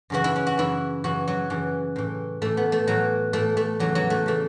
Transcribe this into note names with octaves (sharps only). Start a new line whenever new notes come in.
F#2 C#3 E3 F#4
E4
C#4
F#4
F#2 C#3 E3 E4
F#2 C#3 E3 F#4
F#3
F#2 C#3 E3
A2 E3
A2 E3 A3
B3
A3
A2 E3 F#3
A2 E3 A3
A3
E2 C#3 E3 F#3
F#3
A3
C#3 E3 A3